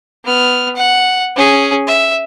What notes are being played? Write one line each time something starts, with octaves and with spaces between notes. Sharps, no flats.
B3 F6
F#5
C#4 G#4
E5